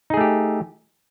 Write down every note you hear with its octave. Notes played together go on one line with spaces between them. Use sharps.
A3 D#4 G4 G#4